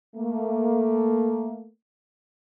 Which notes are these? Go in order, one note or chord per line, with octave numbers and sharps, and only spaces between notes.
A3 A#3